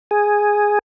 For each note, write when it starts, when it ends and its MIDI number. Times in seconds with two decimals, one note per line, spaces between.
0.11 0.79 68